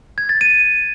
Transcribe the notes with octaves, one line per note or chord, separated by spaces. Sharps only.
G#6
A6
D#7